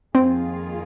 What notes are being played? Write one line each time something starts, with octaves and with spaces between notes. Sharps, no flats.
F2 D#3 A#3 C4 F4 G#4